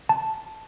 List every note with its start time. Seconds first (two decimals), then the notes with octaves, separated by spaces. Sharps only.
0.09 A5